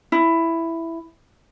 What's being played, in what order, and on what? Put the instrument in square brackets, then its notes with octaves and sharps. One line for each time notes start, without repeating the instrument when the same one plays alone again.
[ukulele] E4